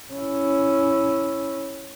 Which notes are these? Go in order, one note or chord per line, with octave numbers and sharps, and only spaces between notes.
C#4 E4